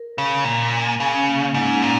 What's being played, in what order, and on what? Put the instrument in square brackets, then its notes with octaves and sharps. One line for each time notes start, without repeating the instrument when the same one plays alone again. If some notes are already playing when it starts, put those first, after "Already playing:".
Already playing: [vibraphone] A#4
[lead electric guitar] C#3
A#2
[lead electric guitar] C#3 [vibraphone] G#4
[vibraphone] C#4
A#3
C#4
[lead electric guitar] G#2 [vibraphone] D#4
[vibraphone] C#4
[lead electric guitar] A#2